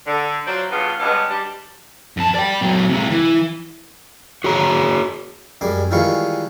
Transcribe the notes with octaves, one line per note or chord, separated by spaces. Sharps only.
D3
F#3 F4 C5 D5
G2 C#3 B3 F4
G2 G#3 B3 C#4
G3 D4
F2 A5
D5 G5
A#2 F#3
C3 G#3
E3
F#4 G#4 C#5 A#5
F#2 G3 G#3 D6
D#3 E3 G3 G#3 F4 C#6